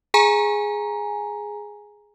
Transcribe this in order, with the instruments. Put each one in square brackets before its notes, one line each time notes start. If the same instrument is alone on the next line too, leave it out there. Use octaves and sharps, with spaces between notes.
[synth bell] G#4 G#5 A#5